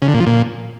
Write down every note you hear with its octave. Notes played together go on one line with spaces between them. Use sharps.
C#3
D3
A#2
F3
A#2